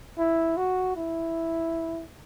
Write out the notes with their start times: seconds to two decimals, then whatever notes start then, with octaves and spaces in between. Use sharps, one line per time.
0.18 E4
0.57 F#4
0.96 E4